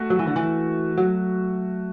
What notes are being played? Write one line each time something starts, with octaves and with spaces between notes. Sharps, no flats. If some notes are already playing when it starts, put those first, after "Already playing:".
Already playing: A3 F#4
F#3
E3
D3
E3
F#3